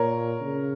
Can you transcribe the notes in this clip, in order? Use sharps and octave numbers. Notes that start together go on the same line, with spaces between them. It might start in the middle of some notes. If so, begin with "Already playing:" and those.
Already playing: A#2 A#4 C#5
C#3